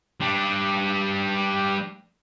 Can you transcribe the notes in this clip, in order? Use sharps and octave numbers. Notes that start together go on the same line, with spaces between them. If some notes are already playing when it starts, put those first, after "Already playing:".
G3 D4